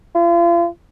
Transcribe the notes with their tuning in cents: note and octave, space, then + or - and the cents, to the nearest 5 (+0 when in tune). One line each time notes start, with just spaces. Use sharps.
F4 -40